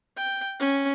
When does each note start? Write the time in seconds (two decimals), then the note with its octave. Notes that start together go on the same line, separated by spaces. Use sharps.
0.17 G5
0.60 C#4